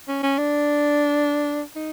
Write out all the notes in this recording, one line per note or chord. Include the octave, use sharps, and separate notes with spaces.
C#4
C#4
D4
D#4